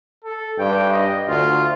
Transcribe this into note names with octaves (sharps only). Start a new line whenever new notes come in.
A4
G2 G5
D#5
D2 F4